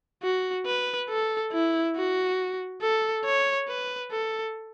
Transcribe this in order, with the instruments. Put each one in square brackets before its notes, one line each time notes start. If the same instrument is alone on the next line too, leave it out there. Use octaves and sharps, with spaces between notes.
[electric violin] F#4
B4
A4
E4
F#4
A4
C#5
B4
A4